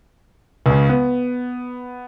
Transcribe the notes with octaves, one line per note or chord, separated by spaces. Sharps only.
C#2 C#3
B3